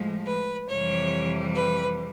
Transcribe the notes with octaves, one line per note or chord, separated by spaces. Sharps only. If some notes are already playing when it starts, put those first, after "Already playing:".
Already playing: A2 F3 G#3
B4
F2 C3 E3 G3 C#5
B4